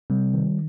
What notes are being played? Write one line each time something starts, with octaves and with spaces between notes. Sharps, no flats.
C3 G3
D#3